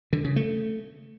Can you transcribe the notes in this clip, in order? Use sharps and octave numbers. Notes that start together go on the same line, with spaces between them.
D3
C#3
A3